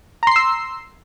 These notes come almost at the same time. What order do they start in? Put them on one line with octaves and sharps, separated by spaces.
A#5 C6 C7 E6